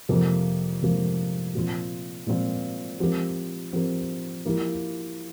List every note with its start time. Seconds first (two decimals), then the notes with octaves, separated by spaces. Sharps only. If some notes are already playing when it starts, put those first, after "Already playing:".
0.09 F2 C3 F3 A#3
0.82 F2 C3 F3 A#3
1.55 A#2 F3 C4 F4
2.27 A#2 F3 C4 F4
3.00 F3 C4 G4 A#4
3.73 F3 C4 G4 A#4
4.46 F3 A#3 E4 G4 A#4